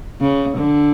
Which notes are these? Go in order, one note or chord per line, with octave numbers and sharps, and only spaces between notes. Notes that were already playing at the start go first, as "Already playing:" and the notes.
C#3
D3